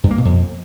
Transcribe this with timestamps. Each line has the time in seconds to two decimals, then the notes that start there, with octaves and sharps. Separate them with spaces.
0.04 G2
0.11 A#3
0.18 B2
0.25 F2